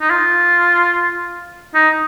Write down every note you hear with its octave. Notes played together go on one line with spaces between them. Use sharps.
D#4
F4
D#4